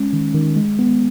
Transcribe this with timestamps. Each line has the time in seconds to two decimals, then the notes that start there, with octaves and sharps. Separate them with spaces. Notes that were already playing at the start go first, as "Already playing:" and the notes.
Already playing: G#3 C#4
0.13 D#3
0.35 D#3
0.56 G#3
0.79 B3